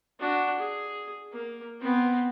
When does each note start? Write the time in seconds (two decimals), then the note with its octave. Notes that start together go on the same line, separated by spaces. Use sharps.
0.20 D4 F#4
0.59 G#4
1.33 A#3
1.81 B3 C4